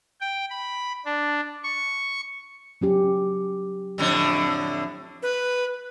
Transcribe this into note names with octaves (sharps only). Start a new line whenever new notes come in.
G5
B5
D4
C#6
F#3 C#4 G4
F2 A2 D3
B4